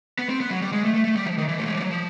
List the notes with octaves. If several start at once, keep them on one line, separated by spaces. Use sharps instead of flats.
B3
C4
B3
F#3
G3
G#3
A3
A3
A3
G3
F3
D#3
E3
A3
G#3
G3
F#3
F3